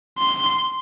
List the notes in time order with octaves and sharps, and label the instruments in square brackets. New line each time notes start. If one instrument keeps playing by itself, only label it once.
[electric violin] C6